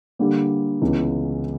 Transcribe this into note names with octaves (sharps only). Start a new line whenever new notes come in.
D3 G3 A#3
C#2 C#3 E3 G#3 B3